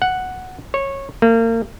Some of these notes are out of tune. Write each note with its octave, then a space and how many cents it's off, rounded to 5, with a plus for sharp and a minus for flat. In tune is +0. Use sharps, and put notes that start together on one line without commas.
F#5 +0
C#5 -15
A#3 -35